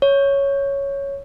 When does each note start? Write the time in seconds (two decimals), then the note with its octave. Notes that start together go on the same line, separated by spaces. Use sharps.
0.02 C#5